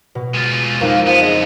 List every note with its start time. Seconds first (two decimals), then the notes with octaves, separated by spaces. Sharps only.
0.15 B2
0.35 G#3 F4
0.81 F2 A#3 D#4 F#6
1.07 F3 B3
1.21 C#3 G#3 A#5